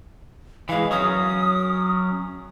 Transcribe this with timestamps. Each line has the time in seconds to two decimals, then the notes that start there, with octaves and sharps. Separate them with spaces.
0.69 E3 G#3 F5
0.91 F#3 C#4 D#6